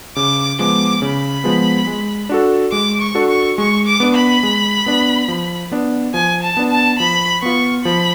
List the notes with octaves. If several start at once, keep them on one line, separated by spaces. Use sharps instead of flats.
C#3 D6
F3 G#3 B3 D6
C#3 B5
F3 G#3 B3
G#3
D4 F#4 A4
G#3 D6
C#6
D4 F#4 A4
C#6
G#3 C#6
D6
B3 D4
B5
G#3
B3 D4
F3
B3 D4
F3 G#5
A5
B3 D4
A5
F3 B5
B3 F4 C#6
F3 B5